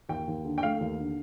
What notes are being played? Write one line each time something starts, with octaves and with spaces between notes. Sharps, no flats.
D#2 G5
D#2
D3
G5
A3 F5
D#2
D3